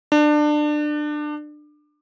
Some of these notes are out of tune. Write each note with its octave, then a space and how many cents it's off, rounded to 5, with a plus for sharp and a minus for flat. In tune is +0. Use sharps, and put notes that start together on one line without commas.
D4 +25